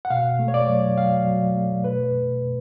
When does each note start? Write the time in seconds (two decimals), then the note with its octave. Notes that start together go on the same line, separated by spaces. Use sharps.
0.05 F#5
0.10 B2 F5
0.39 A3
0.48 C#5
0.54 D5
0.68 F#3
0.97 F#3 F5
1.27 F#3
1.56 A3
1.84 B2 B4
2.14 B2
2.43 B2